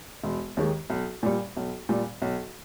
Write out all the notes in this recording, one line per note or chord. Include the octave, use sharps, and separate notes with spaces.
E1
D#2 D#3 G#3
B1
A#2 G3
B1
A#2 G3
B1